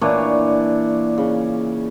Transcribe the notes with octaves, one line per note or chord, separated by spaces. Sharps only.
A#2 E3 D4 C#5
C#3